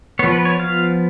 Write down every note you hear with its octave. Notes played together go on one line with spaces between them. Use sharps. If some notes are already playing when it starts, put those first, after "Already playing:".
F3 B3 C#5
B4
C#5
F5